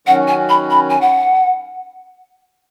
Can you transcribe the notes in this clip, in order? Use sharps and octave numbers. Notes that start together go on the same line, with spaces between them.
D#3 F#3 C#4 F#4 F#5
G#5
B5
B5
G#5
F#5